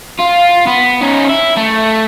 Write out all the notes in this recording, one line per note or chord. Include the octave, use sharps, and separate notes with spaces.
F4
B3
C#4 D#4
E4
A3